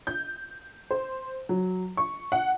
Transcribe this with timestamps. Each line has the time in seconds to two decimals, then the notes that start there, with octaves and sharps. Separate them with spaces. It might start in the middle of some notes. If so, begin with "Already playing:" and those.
0.07 G6
0.91 C5
1.49 F#3
1.97 C#6
2.32 F#5